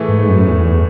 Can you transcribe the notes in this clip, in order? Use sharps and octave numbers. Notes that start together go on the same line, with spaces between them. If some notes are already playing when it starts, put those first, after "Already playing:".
Already playing: A2 E3 A3 E4 G#4
G#2
F#2
E2